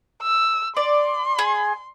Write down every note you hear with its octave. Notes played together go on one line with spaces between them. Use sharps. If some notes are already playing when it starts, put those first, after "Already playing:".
E6
D5 C6
G#4